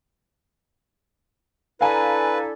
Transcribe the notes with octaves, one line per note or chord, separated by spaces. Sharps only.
D4 E4 A4 B4 F5 G#5 A#5